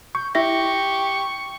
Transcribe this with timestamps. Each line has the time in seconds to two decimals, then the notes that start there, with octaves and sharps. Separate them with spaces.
0.15 C#6 G6
0.35 E4 G4 E5 C#6 A#6